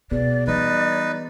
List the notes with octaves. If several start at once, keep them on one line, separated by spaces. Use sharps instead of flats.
B2 B3 G#4 D5
E3 G3 D#4 B4 D5